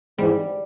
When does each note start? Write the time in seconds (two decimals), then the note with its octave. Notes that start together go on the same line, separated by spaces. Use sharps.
0.18 G#2 E3 G3 G#3 C4